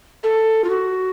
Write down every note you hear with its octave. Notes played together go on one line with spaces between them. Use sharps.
A4
F4
F#4